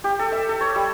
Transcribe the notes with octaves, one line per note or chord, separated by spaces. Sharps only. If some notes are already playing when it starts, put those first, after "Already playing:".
G4
A4
E5
A4
C#5
G3